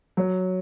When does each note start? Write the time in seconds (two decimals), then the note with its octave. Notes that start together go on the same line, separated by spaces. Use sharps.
0.17 F#3